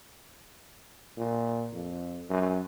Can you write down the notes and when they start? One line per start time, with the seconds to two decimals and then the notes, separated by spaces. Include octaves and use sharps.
1.17 A#2
1.73 F2
2.30 F#2